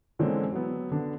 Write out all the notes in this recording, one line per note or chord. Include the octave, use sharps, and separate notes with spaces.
D3 E3 G#3 A#3 C4 C#4
F#3 B3
D3 B3 D4